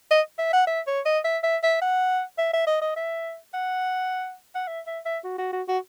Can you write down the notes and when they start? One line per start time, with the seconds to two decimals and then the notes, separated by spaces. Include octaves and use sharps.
0.11 D#5
0.38 E5
0.53 F#5
0.67 E5
0.87 C#5
1.05 D#5
1.24 E5
1.44 E5
1.63 E5
1.81 F#5
2.38 E5
2.53 E5
2.67 D#5
2.82 D#5
2.96 E5
3.54 F#5
4.55 F#5
4.67 E5
4.87 E5
5.05 E5
5.24 F#4
5.38 F#4
5.53 F#4
5.68 F#4